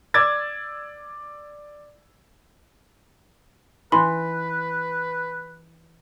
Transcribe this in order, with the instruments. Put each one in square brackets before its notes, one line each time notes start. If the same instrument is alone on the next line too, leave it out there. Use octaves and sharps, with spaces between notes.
[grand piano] D5 D6 E6 G#6 A6
[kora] E3 [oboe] B4 [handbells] B5 C6